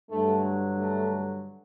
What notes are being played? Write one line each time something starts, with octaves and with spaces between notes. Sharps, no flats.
G2 D3 F#3 A3
A3